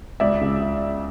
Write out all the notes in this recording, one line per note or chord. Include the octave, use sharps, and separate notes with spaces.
C#2 D5 E5
C#3